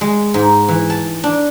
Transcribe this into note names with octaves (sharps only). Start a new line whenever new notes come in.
G#3
G#2
E3
A5
D4